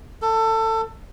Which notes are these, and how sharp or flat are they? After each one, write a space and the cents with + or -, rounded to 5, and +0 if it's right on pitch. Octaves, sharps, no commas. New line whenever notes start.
A4 +20